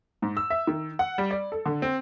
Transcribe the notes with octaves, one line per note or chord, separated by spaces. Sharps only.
G#2
E6
E5
D#3
F#5
G3
D5
A4
D3
C4